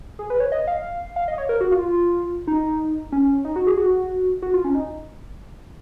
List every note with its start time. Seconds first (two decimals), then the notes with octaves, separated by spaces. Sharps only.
0.19 G#4
0.30 B4
0.40 C#5
0.52 D#5
0.67 F5
1.16 F5
1.28 D#5
1.38 C#5
1.49 A#4
1.61 F#4
1.71 F4
2.47 D#4
3.12 C#4
3.45 D#4
3.56 F#4
3.67 G#4
3.77 F#4
4.42 F#4
4.53 F4
4.64 C#4
4.75 D#4